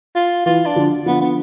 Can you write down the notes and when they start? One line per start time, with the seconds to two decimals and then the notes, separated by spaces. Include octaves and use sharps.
0.15 F4
0.46 E3 F4
0.66 D4
0.76 D3 F3
1.06 D3 F3 B3
1.21 B3